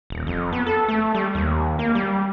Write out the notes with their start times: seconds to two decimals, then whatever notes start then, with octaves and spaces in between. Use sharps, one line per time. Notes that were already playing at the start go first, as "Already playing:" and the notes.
0.10 D#1
0.27 F2
0.53 B3
0.67 A4
0.88 A3
1.15 G3
1.35 D#2
1.79 A#3
1.95 G3